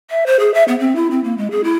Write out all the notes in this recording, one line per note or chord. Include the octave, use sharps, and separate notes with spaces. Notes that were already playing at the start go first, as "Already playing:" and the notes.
E5
C5
G#4
E5
B3
C4
E4
C4
A#3
G#3
G#4
E4